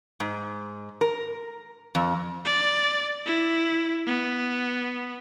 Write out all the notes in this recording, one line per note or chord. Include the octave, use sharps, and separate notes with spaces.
G#2
A#4
F2
D5
E4
B3